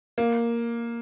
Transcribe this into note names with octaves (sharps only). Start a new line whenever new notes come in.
A#3